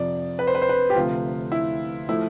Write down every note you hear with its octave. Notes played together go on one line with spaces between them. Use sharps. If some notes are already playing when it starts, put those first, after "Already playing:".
Already playing: F2 C3 F3 D5
B4
C5
B4
C5
B4
G4
D2 C3 F3 A3 F4
E4
F3 A3 E4